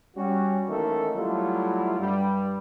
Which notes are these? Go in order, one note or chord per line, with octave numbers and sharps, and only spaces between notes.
G3 C#4 F#4
D#3 E3 A3 A#3 C#4 A4
F#3 G3 A3 E4 F4
G2 G3